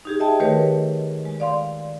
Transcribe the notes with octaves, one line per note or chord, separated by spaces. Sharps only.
D#4 G4 G#4
D#5 E5 G5 A5
D#3 A3 G4 A#4 B4 C#5
G#3
D5 F5 C6